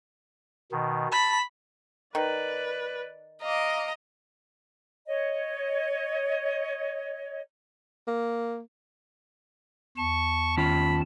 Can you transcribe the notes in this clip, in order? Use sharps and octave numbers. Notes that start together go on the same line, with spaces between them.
B2 D#3
A5 B5
D#3 B4 D5
D#5 F5 A#5 D6
C#5 D#5
A#3
E2 A5 C#6
D#3 C#4 F4 B5